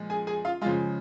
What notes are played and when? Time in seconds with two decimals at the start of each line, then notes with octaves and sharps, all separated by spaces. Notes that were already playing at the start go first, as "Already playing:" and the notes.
Already playing: A#2 F3 G#3
0.10 G#4 G#5
0.27 G#4 G#5
0.45 F4 F5
0.61 C#3 F3 G#3 F4 F5